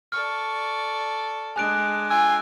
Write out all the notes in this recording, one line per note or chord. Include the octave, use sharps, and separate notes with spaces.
A4 D5 C#6 F6
G#3 D4 G#5 F#6 D7
F4 G5 G#5 E6